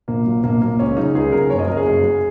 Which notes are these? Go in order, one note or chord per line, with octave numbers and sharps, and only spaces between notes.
A#1 A#3
A#2 F#3
A#1 A#3
A#2 F#3 A#3
C#2 C#4
C#3 F#3 D#4
C#2 G#4
C#3 F#3 A#4
F#1 C#5
D#5
F#2 F#3 A#4
G#4
F#1
F#2 F#3